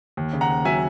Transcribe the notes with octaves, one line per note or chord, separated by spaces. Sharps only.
D#2
C#3
F#5 A#5
D#2
F#3 E5 G#5